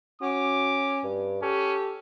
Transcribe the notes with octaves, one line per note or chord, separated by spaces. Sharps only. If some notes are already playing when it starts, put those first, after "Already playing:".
C#4 F#4 D6
G2
C#4 G4 A4